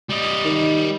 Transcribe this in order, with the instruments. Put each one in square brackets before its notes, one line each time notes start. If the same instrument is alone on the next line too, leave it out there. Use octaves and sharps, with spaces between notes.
[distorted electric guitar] G3 D#5
[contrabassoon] D#3